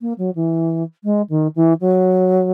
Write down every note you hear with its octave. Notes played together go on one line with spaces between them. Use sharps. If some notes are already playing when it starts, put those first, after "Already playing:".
A#3
F#3
E3
G#3
D#3
E3
F#3